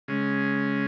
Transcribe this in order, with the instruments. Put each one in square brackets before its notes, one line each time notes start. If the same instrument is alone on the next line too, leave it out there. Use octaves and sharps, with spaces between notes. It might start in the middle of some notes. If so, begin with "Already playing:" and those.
[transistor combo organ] C#3 G#3 C#4